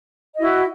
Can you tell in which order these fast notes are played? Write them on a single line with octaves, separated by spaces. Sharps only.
D#5 E4 F#4